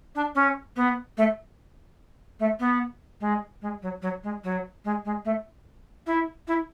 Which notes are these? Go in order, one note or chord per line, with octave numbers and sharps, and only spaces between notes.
D4
C#4
B3
A3
A3
B3
G#3
G#3
F#3
F#3
G#3
F#3
G#3
G#3
A3
E4
E4